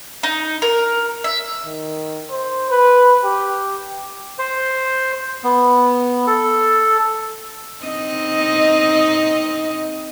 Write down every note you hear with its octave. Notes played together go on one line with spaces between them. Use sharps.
D#4
A#4
E5
D#3
C5
B4
G4
C5
B3
A4
C4 D#4 D#5